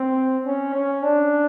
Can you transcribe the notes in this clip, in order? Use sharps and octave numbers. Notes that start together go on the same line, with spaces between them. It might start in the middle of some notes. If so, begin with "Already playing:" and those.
Already playing: C4
C#4
C#4
D4